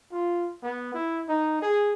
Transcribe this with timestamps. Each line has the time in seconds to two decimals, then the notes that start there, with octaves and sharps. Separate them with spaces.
0.11 F4
0.63 B3
0.94 E4
1.29 D#4
1.62 G#4